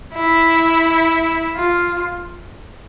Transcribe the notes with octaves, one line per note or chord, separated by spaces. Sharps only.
E4
F4